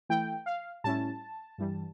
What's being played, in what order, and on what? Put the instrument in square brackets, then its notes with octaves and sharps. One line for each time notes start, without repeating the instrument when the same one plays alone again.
[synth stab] E3 A3 E4 G5
F5
A2 G3 C#4 E4 A5
G2 E3 G3